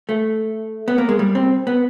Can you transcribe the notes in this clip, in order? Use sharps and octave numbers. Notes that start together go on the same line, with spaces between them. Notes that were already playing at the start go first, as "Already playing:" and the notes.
A3
B3
A#3
G#3
G3
C4
B3